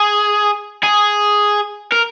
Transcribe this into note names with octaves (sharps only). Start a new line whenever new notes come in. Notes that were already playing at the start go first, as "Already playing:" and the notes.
Already playing: G#4
G#4
A#4